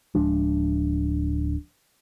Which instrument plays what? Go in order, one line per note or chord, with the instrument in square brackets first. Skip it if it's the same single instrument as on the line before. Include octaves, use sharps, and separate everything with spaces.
[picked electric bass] D1 F3 G#3 D4